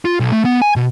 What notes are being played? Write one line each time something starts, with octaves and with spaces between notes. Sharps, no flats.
F4
B1
A3
B3
G#5
B2